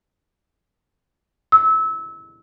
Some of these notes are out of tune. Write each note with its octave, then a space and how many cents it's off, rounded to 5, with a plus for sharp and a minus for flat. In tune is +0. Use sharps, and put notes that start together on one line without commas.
E6 -25